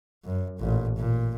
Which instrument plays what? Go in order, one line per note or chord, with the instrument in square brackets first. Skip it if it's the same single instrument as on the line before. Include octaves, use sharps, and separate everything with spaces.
[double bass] F#2
A1 A#2
A#2